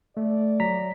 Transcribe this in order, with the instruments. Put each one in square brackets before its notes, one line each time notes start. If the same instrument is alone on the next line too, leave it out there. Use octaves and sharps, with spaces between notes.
[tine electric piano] A3 [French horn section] D5
[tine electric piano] F#3 A#5 B6